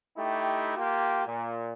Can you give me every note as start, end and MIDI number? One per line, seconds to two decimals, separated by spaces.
0.17 0.74 57
0.17 0.74 63
0.17 0.74 64
0.17 0.74 67
0.76 1.25 58
0.76 1.25 65
0.76 1.25 67
1.27 1.73 46